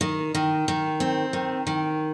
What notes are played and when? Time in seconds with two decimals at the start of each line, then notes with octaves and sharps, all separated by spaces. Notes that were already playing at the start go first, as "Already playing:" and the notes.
0.01 D#3
0.35 D#3
0.68 D#3
1.00 C4
1.33 D#3
1.67 D#3